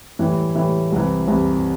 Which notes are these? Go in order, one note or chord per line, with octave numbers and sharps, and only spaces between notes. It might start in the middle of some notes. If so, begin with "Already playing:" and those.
A2 E3 G3 E4
A2 E3 G3 E4
C2 C3 E3
C2 C3 E3